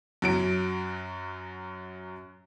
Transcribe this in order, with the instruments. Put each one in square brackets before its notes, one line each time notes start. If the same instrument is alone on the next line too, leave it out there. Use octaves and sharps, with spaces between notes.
[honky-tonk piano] F#2 F#3 D7